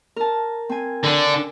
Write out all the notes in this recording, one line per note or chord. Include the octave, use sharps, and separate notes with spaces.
A#4 A5
C4 G#5
D3 D4